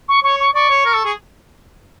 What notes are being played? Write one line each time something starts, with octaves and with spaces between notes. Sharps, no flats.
C#6
C#5 C#6
C#6
D5 C#6
C#5
A#4
A4
G#4